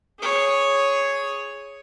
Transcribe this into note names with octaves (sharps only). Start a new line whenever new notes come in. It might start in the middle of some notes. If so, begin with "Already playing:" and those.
G#4 C#5